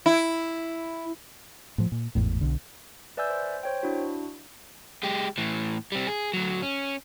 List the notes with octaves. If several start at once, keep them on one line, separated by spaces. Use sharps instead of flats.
E4
A2 F3
A#2
G#1 E2 A2
B1 D3
B4 D5 E5 G#5 E6 G6
C5
C5 C#5 G5
D4 E4 F#4
G#3 G4
A2 E3
G3 C4
G#4
D2 F#3
C#4